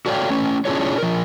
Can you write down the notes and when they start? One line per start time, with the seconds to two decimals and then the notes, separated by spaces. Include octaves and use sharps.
0.06 F#4 A4 C#5 D5 F5 G5
0.30 A3 C#4
0.65 C#4 D4 E4 F4 G#4 C#5
0.98 F3 A#4